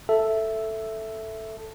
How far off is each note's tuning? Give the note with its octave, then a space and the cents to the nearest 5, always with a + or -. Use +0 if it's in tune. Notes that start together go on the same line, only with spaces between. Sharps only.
A4 +0 E5 +0